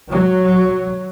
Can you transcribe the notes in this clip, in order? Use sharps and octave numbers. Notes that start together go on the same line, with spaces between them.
F#3